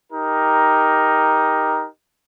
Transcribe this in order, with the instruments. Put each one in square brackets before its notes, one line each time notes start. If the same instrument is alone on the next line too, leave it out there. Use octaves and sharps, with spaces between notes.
[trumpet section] D#4 G4 A#4